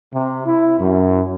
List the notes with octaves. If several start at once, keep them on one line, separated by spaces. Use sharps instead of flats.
C3
E4
F#2